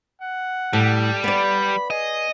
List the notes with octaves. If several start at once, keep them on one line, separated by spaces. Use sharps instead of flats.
F#5
A2 G3
B3 D5 B5
G#4 D#5